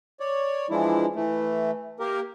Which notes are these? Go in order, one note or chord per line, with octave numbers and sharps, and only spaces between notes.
C#5 D5
E3 F3 G#3 D4 E4
E3 A3
A#3 G4 A#4